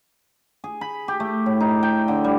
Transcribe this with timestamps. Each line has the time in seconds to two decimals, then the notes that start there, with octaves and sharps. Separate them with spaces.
0.64 G#4
0.81 B5
1.08 G4
1.20 A3
1.46 A2
1.60 D#4
1.83 G5
2.08 D3
2.24 G3